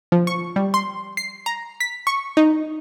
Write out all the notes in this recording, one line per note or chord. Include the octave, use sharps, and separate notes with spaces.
F3
C#6
G3
C6
C7
A#5
B6
C#6
D#4